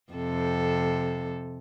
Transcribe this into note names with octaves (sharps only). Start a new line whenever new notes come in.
F2 C3 A4